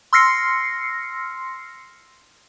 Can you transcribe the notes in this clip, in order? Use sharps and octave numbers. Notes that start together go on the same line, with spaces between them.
C6 E6 F6 A#6 C7 C#7